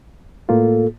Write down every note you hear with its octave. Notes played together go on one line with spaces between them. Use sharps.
A2 A#3 F4 A4